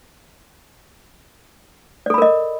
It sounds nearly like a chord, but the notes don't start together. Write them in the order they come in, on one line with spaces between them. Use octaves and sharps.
D5 A4 B5 A#4 D#5